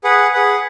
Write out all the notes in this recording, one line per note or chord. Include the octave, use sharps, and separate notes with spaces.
G#4 B4 F#5
G#4 B4 F#5